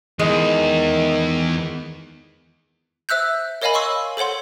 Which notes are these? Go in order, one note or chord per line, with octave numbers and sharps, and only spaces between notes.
E2 D#3 G#3
C5 E5 E6 F#6 G6
A#4 C#5 D#5 F5 G#5 B5
F5 C6 C#6 E6
A4 C5 C#5 F#5 C6